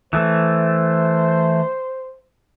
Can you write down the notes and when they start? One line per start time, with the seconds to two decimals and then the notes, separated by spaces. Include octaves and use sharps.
0.13 E3 A3 C5